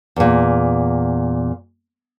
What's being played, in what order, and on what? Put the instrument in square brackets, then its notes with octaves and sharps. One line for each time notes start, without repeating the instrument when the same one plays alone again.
[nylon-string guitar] E2 A#2